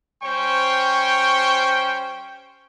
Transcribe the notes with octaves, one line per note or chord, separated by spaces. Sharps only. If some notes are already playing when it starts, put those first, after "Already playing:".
G3 C#4 C5 G5 C#6